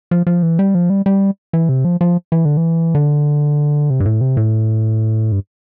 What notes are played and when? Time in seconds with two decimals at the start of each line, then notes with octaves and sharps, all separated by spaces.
0.11 F3
0.27 F3
0.43 E3
0.59 G3
0.75 F3
0.90 G3
1.06 G3
1.53 E3
1.69 C3
1.85 F3
2.01 F3
2.32 E3
2.45 D3
2.57 E3
2.95 D3
3.90 C3
4.00 G2
4.06 A2
4.21 C3
4.37 A2
5.32 G2